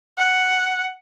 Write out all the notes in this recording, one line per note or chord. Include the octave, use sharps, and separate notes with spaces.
F#5